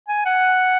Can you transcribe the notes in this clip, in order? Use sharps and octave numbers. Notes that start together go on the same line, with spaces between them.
G#5
F#5